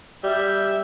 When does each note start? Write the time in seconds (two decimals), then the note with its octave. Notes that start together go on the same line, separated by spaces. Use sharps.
0.24 G3 E5